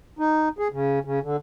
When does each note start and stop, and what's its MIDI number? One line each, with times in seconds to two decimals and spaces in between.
0.19 0.49 63
0.58 0.68 68
0.72 0.99 49
1.05 1.19 49
1.23 1.37 50